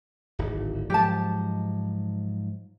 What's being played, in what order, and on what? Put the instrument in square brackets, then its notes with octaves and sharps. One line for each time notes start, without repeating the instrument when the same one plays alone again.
[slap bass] D1 G#1
[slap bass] G#2 F3 F#3 [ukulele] G4 A5